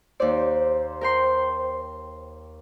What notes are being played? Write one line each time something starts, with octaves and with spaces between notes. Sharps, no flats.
D#2 C5 D5
A#4 G5 C6